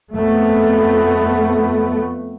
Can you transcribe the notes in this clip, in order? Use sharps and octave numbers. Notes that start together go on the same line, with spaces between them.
F2 A3 B3